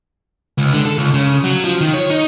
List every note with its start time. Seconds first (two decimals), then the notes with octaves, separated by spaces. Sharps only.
0.58 C#2
0.73 D3
0.85 A4
0.98 C#2
1.14 C#3
1.44 F#3
1.65 F3
1.81 D#3
1.94 C#5
2.10 D#4